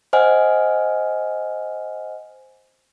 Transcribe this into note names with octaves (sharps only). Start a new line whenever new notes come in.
C5 D#5 F#5 G#5 F6